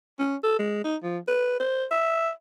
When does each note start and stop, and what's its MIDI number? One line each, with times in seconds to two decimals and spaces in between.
0.19 0.36 61
0.43 0.56 69
0.59 0.82 56
0.84 0.96 63
1.03 1.18 53
1.27 1.55 71
1.60 1.85 72
1.91 2.30 76